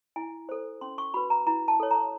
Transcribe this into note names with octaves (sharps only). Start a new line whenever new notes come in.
E4 G#5
A4 C5
C#4 C6
C#6
F#4 B4 B5
A#5
E4 A#5
A5
A4 C#5
A#5